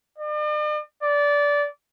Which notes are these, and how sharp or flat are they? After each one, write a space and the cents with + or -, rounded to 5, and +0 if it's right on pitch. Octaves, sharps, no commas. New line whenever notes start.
D5 +45
D5 -20